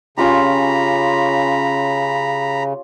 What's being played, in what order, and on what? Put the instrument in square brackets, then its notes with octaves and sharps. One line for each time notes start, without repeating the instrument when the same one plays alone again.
[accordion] C#3 [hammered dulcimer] C#4 F4 G4 [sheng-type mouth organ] A#5 B5